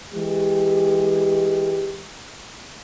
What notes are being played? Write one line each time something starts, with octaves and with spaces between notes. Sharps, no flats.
E3 G#3 G4